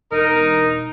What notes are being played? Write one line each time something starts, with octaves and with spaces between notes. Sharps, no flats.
E1 D#4 A#4